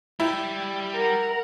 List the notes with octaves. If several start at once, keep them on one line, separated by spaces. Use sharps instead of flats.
G3 E4 G5
A#4 F#5